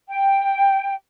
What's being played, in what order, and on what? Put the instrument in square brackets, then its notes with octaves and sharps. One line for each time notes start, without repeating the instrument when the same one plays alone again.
[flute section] G5